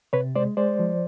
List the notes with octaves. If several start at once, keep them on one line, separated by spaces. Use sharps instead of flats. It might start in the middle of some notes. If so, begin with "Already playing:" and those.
C3 B4 C#5
G#3 C5 D5
G#3 C5 D5
F3